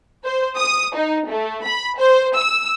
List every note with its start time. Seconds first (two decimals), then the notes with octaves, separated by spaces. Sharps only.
0.24 C5
0.58 D#6
0.96 D#4
1.30 A3
1.66 B5
1.99 C5
2.37 E6